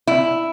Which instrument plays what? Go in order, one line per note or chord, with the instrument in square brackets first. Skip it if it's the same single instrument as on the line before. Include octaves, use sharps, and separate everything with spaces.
[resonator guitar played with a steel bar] E4